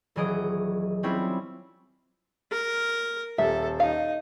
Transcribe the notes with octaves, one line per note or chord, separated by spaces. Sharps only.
D#1 E3 F#3 G#4 D#5 D7
G3 C4 C#4 E4 F4
A#4
D#1 A4 E5
D#4 F5